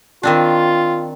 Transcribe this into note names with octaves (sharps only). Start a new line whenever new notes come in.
D#3 C4 D4 F4